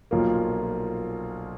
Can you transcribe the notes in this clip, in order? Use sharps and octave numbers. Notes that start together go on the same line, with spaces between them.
B1 A#2 F3 A#3